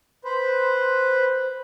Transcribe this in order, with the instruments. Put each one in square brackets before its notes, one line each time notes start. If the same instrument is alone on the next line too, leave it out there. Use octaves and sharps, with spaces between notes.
[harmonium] B4 C5